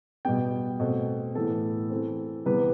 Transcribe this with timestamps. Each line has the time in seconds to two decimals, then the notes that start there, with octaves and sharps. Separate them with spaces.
0.25 B2 G3 B3 G5
0.80 B2 A3 C4
1.35 A2 E3 B3 A4
1.90 E3 A3 C4
2.46 C3 E3 G3 B3 B4